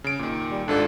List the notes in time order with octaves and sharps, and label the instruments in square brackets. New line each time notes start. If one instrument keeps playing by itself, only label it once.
[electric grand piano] C#3 D7
A#2 D#3
[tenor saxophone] G3
[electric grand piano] G#1 G#2 F4 [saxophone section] D4 [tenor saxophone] A4